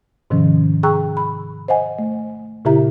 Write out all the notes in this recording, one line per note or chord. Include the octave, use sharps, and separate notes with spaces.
G#2 C3 D#3 F3 C#4
G#4 G5 A#5 C#6 E6 F#6
B5
C5 D#5 F#5 G#5
A3
A#2 C#3 E4 G4 E5 A#5